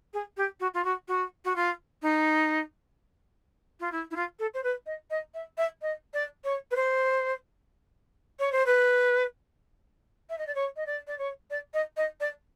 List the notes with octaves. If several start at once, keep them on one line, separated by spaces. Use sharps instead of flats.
G#4
G4
F#4
F4
F#4
F#4
F#4
F4
D#4
F4
E4
E4
F4
A4
C5
B4
D#5
D#5
E5
E5
D#5
D5
C#5
B4
C5
C#5
C5
B4
E5
D#5
D5
C#5
D#5
D5
D5
C#5
D5
D#5
D#5
D5